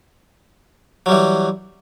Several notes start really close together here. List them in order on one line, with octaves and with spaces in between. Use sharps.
F#3 G3 E3